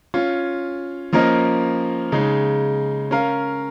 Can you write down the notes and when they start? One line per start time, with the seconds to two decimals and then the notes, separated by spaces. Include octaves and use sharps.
0.14 C#4 F4 C#5
1.13 F3 A#3 C#4 A#4 D#5
2.12 C#3 G#3 D#4
3.11 C#4 A#4 F5